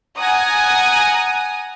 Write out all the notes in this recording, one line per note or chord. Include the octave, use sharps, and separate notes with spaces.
F#5 G#5 A#5 D#6